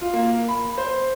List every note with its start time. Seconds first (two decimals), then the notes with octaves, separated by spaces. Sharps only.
0.01 F4
0.13 A#3
0.48 B5
0.78 C5